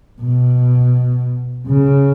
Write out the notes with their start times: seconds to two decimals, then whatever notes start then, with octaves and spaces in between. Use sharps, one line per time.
0.21 B2
1.67 C#3